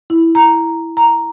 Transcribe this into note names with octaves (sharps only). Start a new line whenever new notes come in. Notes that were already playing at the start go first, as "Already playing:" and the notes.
E4
A#5
A#5